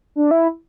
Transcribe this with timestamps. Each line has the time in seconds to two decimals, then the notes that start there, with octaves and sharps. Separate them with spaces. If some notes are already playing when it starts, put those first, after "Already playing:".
0.16 D4
0.31 E4